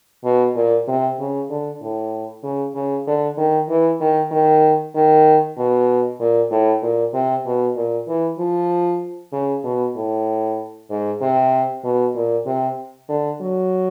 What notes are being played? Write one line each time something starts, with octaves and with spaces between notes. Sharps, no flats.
B2
A#2
C3
C#3
D3
A2
C#3
C#3
D3
D#3
E3
D#3
D#3
D#3
B2
A#2
A2
A#2
C3
B2
A#2
E3
F3
C#3
B2
A2
G#2
C3
B2
A#2
C3
D3
F#3